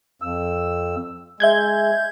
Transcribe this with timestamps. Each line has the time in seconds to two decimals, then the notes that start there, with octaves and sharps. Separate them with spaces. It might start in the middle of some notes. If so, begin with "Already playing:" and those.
0.22 F2 E6
1.40 G#3 E5 G6 G#6